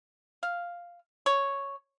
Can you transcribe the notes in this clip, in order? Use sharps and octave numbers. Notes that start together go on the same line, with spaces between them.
F5
C#5